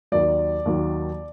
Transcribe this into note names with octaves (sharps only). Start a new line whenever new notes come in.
D#2 D#3 F#3 D5
D#2 D#3 F#3